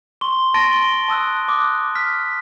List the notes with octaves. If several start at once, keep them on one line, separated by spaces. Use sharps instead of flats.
C6 C#6 G7
A5 C6 A6 A#6 D7 D#7
G7
A5 D#6 E6 F#6
D6 D#6 F#6
F6 B6